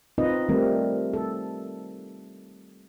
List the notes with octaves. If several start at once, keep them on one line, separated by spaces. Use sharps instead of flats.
C4 D#4 F4 B4 D#5
D#3 G3 A3 C4 A#4
A4